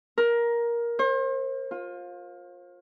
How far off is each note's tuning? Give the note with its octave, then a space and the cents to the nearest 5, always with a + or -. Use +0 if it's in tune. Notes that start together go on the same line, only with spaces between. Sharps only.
A#4 +15
C5 +40
F4 +20